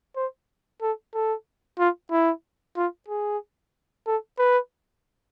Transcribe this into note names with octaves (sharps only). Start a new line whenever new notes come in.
C5
A4
A4
F4
E4
F4
G#4
A4
B4